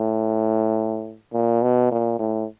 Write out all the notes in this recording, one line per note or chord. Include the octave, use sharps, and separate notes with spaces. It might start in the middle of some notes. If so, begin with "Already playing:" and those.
Already playing: A2
A#2
B2
A#2
A2